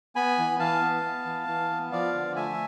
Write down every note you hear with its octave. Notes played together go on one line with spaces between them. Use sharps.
B3 G#5 B5
E3
E3 F5 A5
B3
B3
E3
E3
B3
F3 D5 F5
D3
A3 E5 G#5